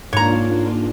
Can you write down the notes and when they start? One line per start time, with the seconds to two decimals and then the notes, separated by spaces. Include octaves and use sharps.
0.13 G#2 A#3 D4 F4 C#5 A#5